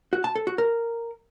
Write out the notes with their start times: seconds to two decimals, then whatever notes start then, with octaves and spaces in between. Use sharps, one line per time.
0.13 F#4
0.24 A5
0.35 A4
0.47 F#4
0.58 A#4